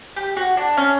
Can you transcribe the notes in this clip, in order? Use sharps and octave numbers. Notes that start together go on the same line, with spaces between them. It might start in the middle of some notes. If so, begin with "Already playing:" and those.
G4
F#4
D4
C#4